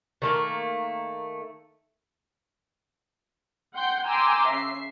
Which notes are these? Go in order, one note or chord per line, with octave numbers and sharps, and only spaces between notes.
D#3 A3 A#3
F#5 G5 C6 G6
G5 G#5 A#5 C6 D6 E6
C#3 E5 C7